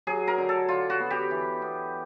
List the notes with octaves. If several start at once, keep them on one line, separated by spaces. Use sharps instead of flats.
F#3 G#4
A#4
D3
A4
D3 F4
F#4
B3
G4
E3
B3